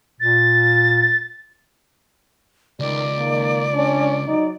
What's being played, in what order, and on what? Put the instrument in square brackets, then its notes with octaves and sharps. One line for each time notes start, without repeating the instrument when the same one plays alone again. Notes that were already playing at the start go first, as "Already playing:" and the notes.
[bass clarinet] A#2 [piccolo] A6
[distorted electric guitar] C#2 [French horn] D#3 [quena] D5
[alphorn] D#3 [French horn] A#3
[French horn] C#4 [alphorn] D4
[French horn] F#3 [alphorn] D#4